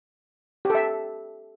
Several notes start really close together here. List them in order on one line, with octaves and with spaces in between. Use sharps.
G4 A4 E5